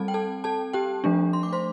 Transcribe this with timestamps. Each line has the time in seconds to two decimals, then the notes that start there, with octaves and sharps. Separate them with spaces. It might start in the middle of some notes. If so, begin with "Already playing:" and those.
Already playing: G3 C4 A4 A5
0.08 G5
0.14 A4 A5
0.44 A4 A5
0.73 G4 G5
1.04 F3 A3 D4
1.33 C6
1.43 D6
1.53 C5 C6